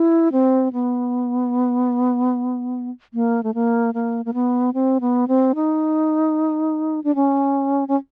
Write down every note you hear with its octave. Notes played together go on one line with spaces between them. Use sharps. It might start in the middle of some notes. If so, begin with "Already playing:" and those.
Already playing: E4
C4
B3
A#3
A3
A#3
A#3
A#3
B3
C4
B3
C4
D#4
D4
C#4
C#4